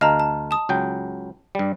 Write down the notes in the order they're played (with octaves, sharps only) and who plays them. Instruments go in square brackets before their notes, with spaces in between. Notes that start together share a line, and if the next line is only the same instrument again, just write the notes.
[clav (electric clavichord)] D2 F5 [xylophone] D#5 A5 A#5
[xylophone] A5
A5 D#6
[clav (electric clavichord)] C#2 F#3 G5
G2 G3